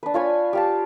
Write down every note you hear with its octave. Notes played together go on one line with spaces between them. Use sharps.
D4 B4
F4 C#5 G#5 B5
G4 F5 A5